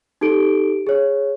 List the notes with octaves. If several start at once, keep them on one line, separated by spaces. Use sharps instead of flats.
D#4 G4 A4 D7
G#4 C#5